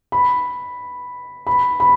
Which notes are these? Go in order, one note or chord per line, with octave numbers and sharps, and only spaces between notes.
B5
B5
B5